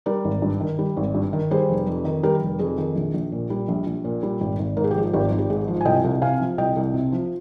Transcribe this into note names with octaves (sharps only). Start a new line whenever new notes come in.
G3 A#4 D5
G#1
G2
D#3
G3
G#1
G2
D#3
G3 G#4 C5
F1
F2
D#3
G3 G4 A#4
F1
F2 G#4
D#3
A#1
A#1
A#2
G3
A#1
A#1
A#2
G3
G#1 G4
G#1
G#2 A#4
G#4
G4
F3 G#4
G#1 G4
G#1
G4
G#2 G#4
F3
G#5
C2 D#5 G5
C2
C3 F5 G#5
F3
C2 D#5 G5
C2
C3
F3